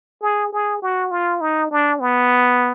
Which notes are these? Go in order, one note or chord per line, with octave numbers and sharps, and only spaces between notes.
G#4
G#4
F#4
F4
D#4
D4
B3